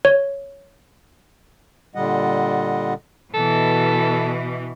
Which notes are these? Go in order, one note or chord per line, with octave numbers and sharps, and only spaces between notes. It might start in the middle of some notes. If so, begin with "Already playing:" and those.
C#5
A#2 D3 G3 D#5 F#5
B2 E3 A4